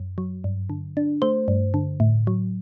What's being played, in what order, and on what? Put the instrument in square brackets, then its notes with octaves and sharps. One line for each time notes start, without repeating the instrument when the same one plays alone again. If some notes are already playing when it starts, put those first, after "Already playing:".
Already playing: [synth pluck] F#2
F#3
G2
D3
D4
A3 C5
G2
D3
A2
F#3